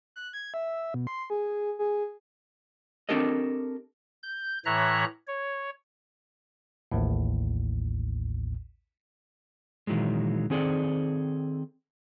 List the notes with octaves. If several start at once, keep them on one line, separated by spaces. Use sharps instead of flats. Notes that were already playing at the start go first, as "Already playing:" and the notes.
F#6
G#6
E5
B2
C6
G#4
G#4
C4 D4 G4 A4 A#4 D#5
G6
A2 E3 C#5 E5 A#5 F#6
C#5
A1 D#2 A2
A#2 D#3 E3 F#3 G#3
D#3 C4 G#4 A4 D5